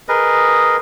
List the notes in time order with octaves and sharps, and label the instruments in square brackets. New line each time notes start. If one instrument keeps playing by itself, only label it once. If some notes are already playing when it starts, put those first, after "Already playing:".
[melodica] G#4 A#4 B4 D#5